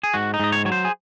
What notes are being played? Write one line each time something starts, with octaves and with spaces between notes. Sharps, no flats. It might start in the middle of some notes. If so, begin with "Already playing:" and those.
G#4
G#2 F#4
D#4
G#2 D#5
C#5
F#3 C#5
C5
G#4